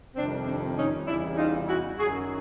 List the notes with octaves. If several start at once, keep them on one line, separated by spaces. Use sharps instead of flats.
F2 C3 D#3 G3 C4 D4
C4 D4
C#4 D#4
E2 C#3 E3 G3 D4 E4
D#4 F4
E4 F#4
F#2 D#3 F#3 F#4 G#4